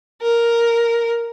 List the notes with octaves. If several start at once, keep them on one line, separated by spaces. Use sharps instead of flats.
A#4